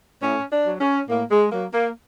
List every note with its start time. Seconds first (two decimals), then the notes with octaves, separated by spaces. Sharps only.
0.23 A2 C#4
0.53 D4
0.67 F#3
0.81 C#4
1.10 A2 A#3
1.31 G#3
1.52 F#3 A#3
1.74 A#3